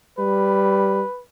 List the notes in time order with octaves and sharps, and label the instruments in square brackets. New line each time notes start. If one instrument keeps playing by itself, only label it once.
[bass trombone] G3 [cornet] B4